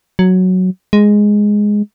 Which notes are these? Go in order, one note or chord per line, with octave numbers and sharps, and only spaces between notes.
F#3
G#3